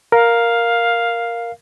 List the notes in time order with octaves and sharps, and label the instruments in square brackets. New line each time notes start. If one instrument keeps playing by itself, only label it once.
[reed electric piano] A#4 [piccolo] F5